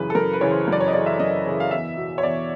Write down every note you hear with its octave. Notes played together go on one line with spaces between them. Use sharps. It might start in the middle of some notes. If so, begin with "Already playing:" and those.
Already playing: F#2 C#3 E3 B4
A4
F#2 A#4
B4
C#3 E3 C#5
C5
F#2 D5
C#5
D#5
C#3 E3 D5
E5
F#2 D#5
C#3 E3
F5
E2 E5
B2
C#5
E2 D5